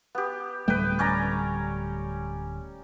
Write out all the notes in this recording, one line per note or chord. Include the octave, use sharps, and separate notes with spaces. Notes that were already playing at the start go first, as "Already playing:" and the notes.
B3 G4
D1 G3 A3 B4 G5
C#4 D5 A#5